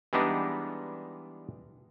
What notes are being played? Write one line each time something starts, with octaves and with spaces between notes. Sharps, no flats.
E3 G3 G#3 B3 D4 D#4